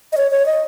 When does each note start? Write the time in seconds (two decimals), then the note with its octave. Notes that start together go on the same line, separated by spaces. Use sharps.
0.13 D#5
0.17 C#5
0.31 C#5
0.46 D#5